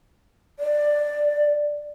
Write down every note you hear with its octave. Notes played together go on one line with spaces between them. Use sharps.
D5